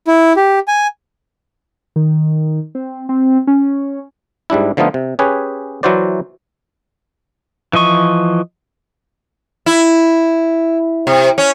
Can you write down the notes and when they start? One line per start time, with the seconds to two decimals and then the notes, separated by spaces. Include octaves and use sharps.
0.08 E4
0.36 G4
0.68 G#5
1.96 D#3
2.75 C4
3.09 C4
3.47 C#4
4.50 G#2 G3 D4 E4
4.77 D3 F3 A3 B3 D#4 F4
4.94 C3
5.19 C#4 G4 G#4 B4 C#5
5.83 E3 F#3 E4 F#4 C5 D5
7.73 E3 F3 D#5 C#6
9.66 E4
11.07 C3
11.38 C#4